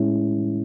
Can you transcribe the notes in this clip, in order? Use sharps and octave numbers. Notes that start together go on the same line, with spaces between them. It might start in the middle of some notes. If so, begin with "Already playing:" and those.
Already playing: A2 G#3 C#4 E4